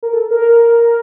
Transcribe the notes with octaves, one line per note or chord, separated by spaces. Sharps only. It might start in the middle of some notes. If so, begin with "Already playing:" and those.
A#4
A4
A#4